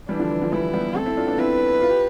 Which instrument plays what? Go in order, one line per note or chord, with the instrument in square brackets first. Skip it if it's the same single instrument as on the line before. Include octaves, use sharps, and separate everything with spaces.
[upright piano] E3 G3 [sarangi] D4
[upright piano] D3 F3
E3
D3 F3
[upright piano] E3 G3 [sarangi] E4
[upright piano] G3 B3
[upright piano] A3 C4 [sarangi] A4
[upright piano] C4 E4
D4 F4
B3 D4
[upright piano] C4 E4 [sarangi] B4
[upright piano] F4
G4